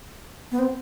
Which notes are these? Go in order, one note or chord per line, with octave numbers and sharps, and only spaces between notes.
B3
C4